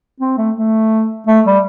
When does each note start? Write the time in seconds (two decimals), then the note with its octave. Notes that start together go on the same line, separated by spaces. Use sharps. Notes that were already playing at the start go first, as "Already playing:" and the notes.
0.20 C4
0.38 A3
0.56 A3
1.27 A3
1.46 G3